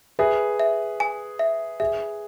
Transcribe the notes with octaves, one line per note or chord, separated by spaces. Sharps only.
G#4 B4 E5
E5
G#5
E5
G#4 E5